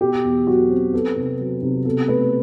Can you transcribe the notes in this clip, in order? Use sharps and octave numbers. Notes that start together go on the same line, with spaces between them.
B2 G4
E2
F#3 F#4
C4
B3 A4
C3
F#3
C3
B2 A4
A3 B4